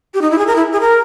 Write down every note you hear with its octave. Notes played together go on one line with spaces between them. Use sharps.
G4
D#4
E4
G#4
A#4
E4
G#4
A#4